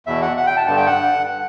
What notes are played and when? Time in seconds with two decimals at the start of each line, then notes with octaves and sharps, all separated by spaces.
0.06 E2 B2 E5
0.22 F#5
0.37 F#5
0.47 G5
0.57 A5
0.67 G2 D3 A5
0.77 G5
0.87 F#5